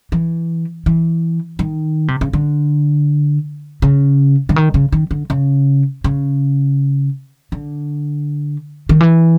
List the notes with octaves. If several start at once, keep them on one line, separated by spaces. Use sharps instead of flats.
E3
E3
D#3
C3
C#3
D3
C#3
D3
D#3
C#3
D#3
D3
C#3
C#3
D3
D#3
E3